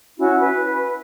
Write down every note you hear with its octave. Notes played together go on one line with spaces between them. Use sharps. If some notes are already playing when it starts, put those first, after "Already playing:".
C#4 E4 F#4
B4